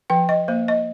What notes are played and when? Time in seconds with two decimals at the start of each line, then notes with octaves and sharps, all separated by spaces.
0.10 F3 G5
0.29 D#5
0.48 A#3 C5
0.68 D#5